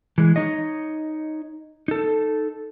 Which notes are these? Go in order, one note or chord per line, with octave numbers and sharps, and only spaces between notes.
E3 G#3
D#4 C#5 D#5
D#4 A4